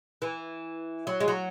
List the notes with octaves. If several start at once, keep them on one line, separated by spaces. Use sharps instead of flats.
E3
F#3
G#3
F#3